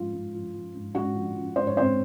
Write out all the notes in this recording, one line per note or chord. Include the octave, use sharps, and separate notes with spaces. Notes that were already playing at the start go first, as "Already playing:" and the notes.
Already playing: G#2 F3 F4
G#2
F3
F3
G#2
G#2 F#4 F#5
F3
F3
G#2 C5
C#5
G#2 C4 C5